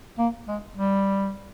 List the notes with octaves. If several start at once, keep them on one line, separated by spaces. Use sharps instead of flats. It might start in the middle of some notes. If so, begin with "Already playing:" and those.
A#3
G#3
G3